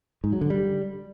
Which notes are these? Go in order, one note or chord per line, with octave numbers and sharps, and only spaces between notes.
G#2
F#3
D3
G3